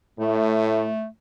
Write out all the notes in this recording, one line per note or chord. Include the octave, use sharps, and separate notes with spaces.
A2 A3